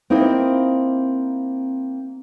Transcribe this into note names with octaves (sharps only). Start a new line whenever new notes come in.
A#3 C4 D#4 E4 C5